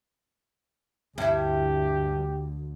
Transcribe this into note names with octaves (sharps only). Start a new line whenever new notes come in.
D2 G2 E4 G4